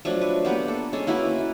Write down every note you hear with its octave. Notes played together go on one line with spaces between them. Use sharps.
F3 F#3 A3 D4
B4
A#3 B3 G4 F#5
A4
G#3 C#4 A4
A#3 E4 F#4 B4